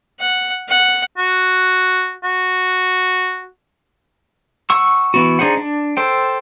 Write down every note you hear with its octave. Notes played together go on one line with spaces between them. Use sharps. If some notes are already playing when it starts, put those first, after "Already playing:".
F#5
F#5
F#4
F#4
F#5 C#6 E6
E3 B3 F#4
D4 D#4 G#4 C5 F#5
D4
A4 C5 G5